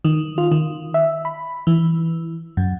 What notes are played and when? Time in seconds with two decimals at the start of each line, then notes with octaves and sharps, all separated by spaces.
0.05 D#3
0.38 F4
0.51 D#3
0.94 E5
1.25 B5
1.67 E3
2.57 F#2